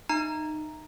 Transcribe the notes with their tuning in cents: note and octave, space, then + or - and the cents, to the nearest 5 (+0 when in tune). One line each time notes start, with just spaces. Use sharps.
D#4 -20 E5 +0 A#5 +0